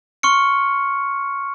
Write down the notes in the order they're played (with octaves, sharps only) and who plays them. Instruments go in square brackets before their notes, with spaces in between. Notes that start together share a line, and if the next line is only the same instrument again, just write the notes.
[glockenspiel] C6 C#6 F6 C#7